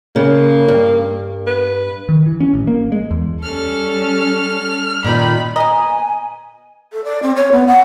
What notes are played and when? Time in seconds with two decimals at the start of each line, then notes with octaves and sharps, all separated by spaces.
0.16 C#3 A#3
0.68 G2
1.47 B4
2.09 D#3
2.26 E3
2.40 C#4
2.54 A1
2.67 A#3
2.92 G#3
3.11 E2
3.43 G3 C#4 A4 F6
5.04 A#2 D#3 B5
5.56 B3 D#5 G#5 A#5
6.93 A4
7.04 D5
7.23 C4
7.36 C#5
7.52 B3
7.67 F#5